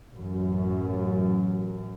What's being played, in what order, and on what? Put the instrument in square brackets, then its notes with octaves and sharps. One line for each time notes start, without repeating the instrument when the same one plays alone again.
[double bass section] A1 F#2